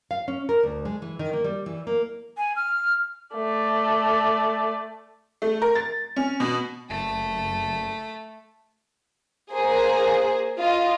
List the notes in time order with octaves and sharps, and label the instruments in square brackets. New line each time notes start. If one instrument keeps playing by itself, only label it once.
[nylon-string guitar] F5
C#4
A#4
D2
G#3
E3
D#3
A#3
G3
E3
A#3
[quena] G#5
F6
[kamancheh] A3 D5
[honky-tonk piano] A3
A#4
A6
C#4
B2
[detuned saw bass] F#1 [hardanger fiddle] A3 A4
[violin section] A#3 G#4 C5
F4 D#5